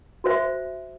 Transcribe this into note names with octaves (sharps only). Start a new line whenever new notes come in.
F#4 C5 E5